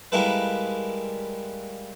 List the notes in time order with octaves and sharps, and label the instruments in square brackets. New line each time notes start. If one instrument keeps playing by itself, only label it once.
[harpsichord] G3 G#3 A#3 E4 A4 B4